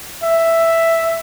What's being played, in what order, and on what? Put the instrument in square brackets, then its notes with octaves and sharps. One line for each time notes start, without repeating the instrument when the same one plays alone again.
[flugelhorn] E5